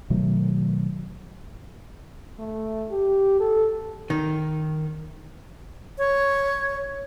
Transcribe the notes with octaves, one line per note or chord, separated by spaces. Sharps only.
B2 D#3 F#3 A3
A3
G4
A4
D#3
C#5